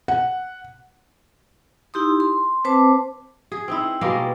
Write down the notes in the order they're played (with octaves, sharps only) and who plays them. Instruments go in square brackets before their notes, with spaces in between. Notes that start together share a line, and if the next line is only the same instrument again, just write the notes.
[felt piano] F#5
[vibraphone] D#4 E4 G4 C6 D#6
C6
C4 B4 C5 A5 D6
[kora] G#4
C4 D#4 E4
B2 G3 G#3 A#3